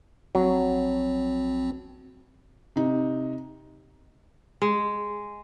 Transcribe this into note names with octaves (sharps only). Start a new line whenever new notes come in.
A#1 F#3 C4
C3 D#4
G#3